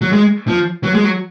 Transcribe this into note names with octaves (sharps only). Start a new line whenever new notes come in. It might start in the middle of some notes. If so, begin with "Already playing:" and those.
F#3
G#3
F3
F#3
G#3
F#3